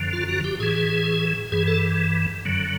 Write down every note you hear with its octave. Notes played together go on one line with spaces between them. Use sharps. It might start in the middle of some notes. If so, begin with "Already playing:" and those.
Already playing: F#2 D3 F3
F4
F#4
G4
A2 E3 G#4
G2 E3 G#4
A4
F#2 D3 F#3